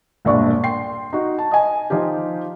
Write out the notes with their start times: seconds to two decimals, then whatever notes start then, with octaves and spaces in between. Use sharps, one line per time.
0.25 E1 A#1 G2 D4 D5 C#6
0.64 G5 C6 C7
1.13 D#4 F#4
1.39 A5
1.51 D#5 G#5
1.90 F3 D#4 F4 G4